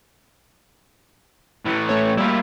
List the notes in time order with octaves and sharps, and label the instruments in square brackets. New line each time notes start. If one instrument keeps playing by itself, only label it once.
[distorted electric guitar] A2 E3
[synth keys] A3 C#5
[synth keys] G3 A#3 [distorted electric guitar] E4 F4